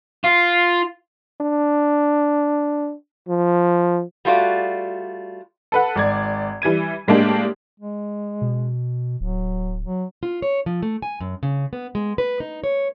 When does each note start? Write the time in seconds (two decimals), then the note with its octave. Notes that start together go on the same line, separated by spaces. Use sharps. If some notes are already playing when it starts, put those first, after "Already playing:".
0.24 F4
1.41 D4
3.29 F3
4.25 G3 A3 F4 F#4 D5
5.72 A4 B4 F#5
5.96 G#1 D5 G#6
6.62 E3 G3 G#6 D#7
7.08 A2 G#3 A#3 D4 G4
7.80 G#3
8.41 B2
9.21 D1 F#3
9.85 F#3
10.23 F4
10.42 C#5
10.66 F3
10.83 A3
11.02 G#5
11.20 F#2
11.43 C#3
11.73 B3
11.95 G#3
12.18 B4
12.40 D#4
12.64 C#5